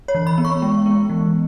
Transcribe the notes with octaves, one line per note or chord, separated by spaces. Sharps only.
C#5
E3
B5
B3
C#6
G#3
B3
E3